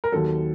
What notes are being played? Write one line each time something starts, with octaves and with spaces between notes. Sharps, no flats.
A#4
D#2 D#3 F#3 A4